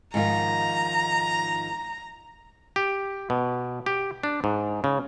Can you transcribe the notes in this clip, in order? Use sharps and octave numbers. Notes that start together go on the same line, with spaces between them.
G#2 D#3 F3 A#5
G4
B2
G4
D4
G#2
C#3